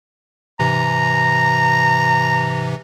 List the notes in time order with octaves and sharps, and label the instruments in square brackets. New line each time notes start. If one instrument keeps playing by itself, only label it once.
[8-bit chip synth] G#2 C3 E3 [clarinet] A#5